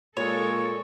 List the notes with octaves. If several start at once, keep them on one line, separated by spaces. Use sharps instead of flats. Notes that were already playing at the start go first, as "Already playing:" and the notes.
A#2 G#3 A4 C#5 C#6